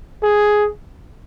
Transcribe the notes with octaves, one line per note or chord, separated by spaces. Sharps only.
G#4